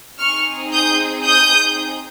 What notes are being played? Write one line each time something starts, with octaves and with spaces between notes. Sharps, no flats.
C4 D#4 G#4 C#6 F6
D#6 G6
D#6 G6